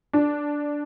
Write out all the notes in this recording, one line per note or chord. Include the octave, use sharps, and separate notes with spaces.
D4